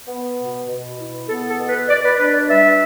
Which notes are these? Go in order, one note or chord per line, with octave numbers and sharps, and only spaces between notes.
B3
B2
B2
E4
B3 A4
A4
B2
B4
B2 D5
B4
D4 B4
D5
G3 E5